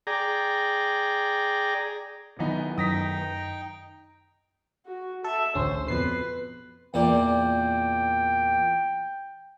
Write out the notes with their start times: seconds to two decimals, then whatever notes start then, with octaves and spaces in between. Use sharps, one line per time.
0.07 G#4 D5 G5 A#5
2.39 D#3 E3 F#3 B3 D#4
2.78 F#2 D#4 G5 D#6 A#6 B6
4.86 F#4
5.24 A4 E5
5.55 A1 D2 C#4 C5
5.88 F2 B2 B4 C7
6.94 E2 A#2 D5 G5